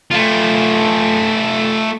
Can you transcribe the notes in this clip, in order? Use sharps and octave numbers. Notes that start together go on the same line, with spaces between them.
A3 F4